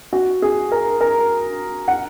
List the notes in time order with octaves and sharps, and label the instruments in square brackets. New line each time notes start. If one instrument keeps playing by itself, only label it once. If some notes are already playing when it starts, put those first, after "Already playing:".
[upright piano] F#4
G#4
A#4
A#4
F#5